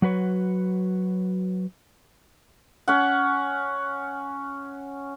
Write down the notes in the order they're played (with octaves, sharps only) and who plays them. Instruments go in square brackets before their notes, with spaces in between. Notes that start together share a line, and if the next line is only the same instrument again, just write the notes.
[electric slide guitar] F#3 F#4 B4 C#5
[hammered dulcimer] C#4 F#5